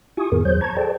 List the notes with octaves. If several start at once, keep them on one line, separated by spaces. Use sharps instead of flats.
E4 F4 G4 G#5 C#6 D#6
F2 A2 D#3 B3 G#4 A#4
E2 F#3 C5 C#5 G6
A5 A#5 C#6 G#6
G#4 A4 C5 D5 G5 A5